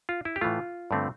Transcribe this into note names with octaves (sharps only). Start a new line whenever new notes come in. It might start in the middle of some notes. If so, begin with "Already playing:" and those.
F4
E4
G4
A2 E3 A3 F4
G2 D3 A3 C4